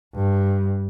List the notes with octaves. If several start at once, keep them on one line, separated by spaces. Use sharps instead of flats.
G2